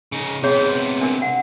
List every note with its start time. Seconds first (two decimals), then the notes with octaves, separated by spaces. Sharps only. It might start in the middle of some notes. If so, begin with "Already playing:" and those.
0.12 C#3 D#4
0.43 C3 B3 G#4 C#5 C6
1.01 D4 A#4
1.22 F#5